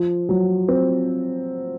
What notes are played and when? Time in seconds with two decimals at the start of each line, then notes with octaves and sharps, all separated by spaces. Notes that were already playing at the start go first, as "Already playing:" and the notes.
Already playing: F3
0.29 F#3
0.68 C4